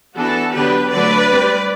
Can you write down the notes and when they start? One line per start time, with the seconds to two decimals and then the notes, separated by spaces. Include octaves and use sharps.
0.17 E3 B3 D4 F#4 A4
0.55 D3 F#3 B3 D4 G4 B4
0.93 D3 F#3 A3 D4 B4 D5
1.31 G3 C4